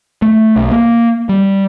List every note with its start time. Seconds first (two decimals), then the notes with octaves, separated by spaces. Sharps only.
0.22 A3
0.56 B1
0.72 A#3
1.29 G3